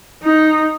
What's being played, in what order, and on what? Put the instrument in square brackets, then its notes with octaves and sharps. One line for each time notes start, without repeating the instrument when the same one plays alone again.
[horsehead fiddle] D#4